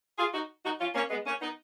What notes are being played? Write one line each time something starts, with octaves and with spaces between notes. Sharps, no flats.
F4 G#4
D#4 F#4
D#4 F#4
C#4 F4
A#3 C#4
G#3 B3
A#3 C#4
B3 D#4